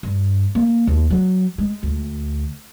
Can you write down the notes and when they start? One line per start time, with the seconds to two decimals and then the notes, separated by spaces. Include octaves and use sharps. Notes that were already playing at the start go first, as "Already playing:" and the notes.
0.03 G2
0.55 A#3
0.87 D#2
1.11 F#3
1.58 G#3
1.83 D2